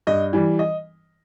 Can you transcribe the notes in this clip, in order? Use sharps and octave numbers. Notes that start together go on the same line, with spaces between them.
G2 D#5
E3 G3
D#5